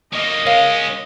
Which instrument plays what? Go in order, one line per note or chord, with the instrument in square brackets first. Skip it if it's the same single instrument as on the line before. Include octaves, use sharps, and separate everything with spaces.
[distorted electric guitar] F#3 A#3 [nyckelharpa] D#5
[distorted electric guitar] G#3 C#4 [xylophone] A#4 C#5 F5